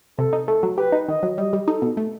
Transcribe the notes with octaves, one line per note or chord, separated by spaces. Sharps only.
C3 A4
D#4
A3 A4
F#3
G4 B4
D#4
D#3 D#5
F#3
G3 D#5
G3
D#4 A4
B2
A3